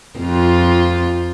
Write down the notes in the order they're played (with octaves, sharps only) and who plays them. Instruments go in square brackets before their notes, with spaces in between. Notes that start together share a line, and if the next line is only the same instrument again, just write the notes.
[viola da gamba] F2 F4